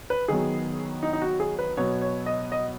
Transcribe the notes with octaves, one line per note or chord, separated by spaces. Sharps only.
B4
D#3 F#3 B3 G#4
D#4
D#4
F#4
G#4
B4
B2 F#3 B3 C#5
C#5
D#5
D#5